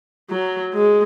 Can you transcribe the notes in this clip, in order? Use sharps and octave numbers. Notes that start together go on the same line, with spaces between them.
F#3
G#3